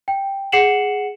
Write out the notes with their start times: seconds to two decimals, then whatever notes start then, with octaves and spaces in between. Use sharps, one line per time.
0.08 G5
0.52 G#4 F#5 C7 C#7 E7 F#7